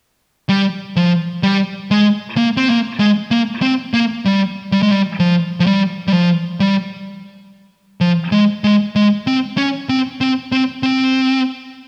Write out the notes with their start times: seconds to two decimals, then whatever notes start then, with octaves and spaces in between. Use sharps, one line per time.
0.49 G3
0.96 F3
1.43 G3
1.91 G#3
2.37 A#3
2.57 C4
2.69 A#3
3.00 G#3
3.31 A#3
3.62 C4
3.94 A#3
4.25 G3
4.72 G3
4.83 G#3
4.92 G3
5.20 F3
5.60 F3
5.66 G3
6.08 G3
6.13 F3
6.60 G3
8.01 F3
8.32 G#3
8.64 G#3
8.96 G#3
9.27 C4
9.57 C#4
9.89 C4
10.21 C4
10.52 C4
10.83 C4